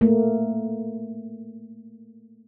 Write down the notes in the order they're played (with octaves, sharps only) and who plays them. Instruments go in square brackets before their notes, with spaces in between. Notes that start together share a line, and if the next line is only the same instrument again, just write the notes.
[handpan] A3 A#3